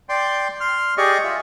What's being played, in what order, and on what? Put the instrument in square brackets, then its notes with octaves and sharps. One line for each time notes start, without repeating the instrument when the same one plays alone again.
[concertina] D5 G5 C6
C6 F6
G4 G#4 D5 D#5 C#6
F4 E5